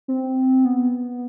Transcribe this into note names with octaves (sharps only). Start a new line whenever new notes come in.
C4
B3